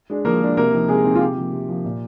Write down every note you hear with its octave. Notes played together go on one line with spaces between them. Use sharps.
G#3 D4
F3 A#3 A#4
G#3 D4
C3 A#3 A#4
F3 C4 D#4
C3 G#3 G#4
F3 C4 D#4
F4
C3 G4
F3 A#3
C3
F3 A#3
A#2